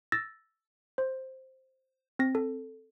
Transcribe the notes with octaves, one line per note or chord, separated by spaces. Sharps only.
E6 A6 A#6
C5
C4 A#6
A4